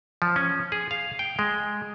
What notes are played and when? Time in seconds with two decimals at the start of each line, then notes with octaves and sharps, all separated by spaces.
0.22 F3
0.36 C#4
0.72 G#4
0.91 F5
1.19 G5
1.39 G#3